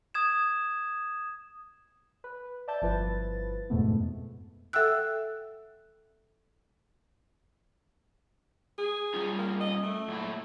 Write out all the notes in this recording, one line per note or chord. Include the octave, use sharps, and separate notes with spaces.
D#6 G#6 E7
B4
D5 E5 A5 G6
G1 F3 E4 B4 A6
F2 G#2 B2 A3 B3
A4 E5 F#5 G5 E6 F#6
G#4
G3 C#4 F4
A#3
D#5
A3
F#2 A#2 E4